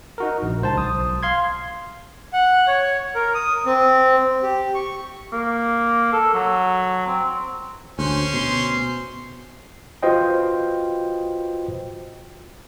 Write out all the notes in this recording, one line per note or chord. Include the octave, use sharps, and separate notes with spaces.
D#4 F#4 A#4
A#1
C#2 C5 A5
B1 D#6
F5 C6 G#6
F#5
C#5
A#4
D#6
C4
G4
C#6
A#3
A4
F#3
C4
D2 C#4 C5
B2 C6
F4 F#4 B4 C5 D#5 G5